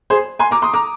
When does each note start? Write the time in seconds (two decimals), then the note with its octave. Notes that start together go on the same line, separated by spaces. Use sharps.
0.10 G#4 C5
0.39 G#5 C6
0.51 A#5 D6
0.62 C6 D#6
0.74 A#5 D6